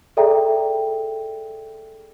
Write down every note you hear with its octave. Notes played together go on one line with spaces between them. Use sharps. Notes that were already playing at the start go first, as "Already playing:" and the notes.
G#4 A4 D5 E5 G5 A#5